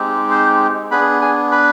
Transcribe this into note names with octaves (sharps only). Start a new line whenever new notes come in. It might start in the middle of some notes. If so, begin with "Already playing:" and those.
Already playing: G#3 C4 D#4 G4
C5 C6
B3 D4 G#4 B4 B5
G#4 G#5
B4 B5